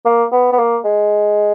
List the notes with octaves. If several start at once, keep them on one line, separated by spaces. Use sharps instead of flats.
A#3
B3
B3
A#3
G#3